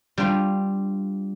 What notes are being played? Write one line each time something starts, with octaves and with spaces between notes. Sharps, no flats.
G3 D4 F4 G5